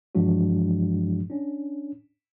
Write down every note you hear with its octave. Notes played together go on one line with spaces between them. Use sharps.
G2 E3 F3 G#3 D4 F#4
C#4 D4